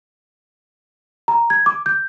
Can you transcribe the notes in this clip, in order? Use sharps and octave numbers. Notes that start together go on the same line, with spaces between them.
A#5
G#6
D6
G6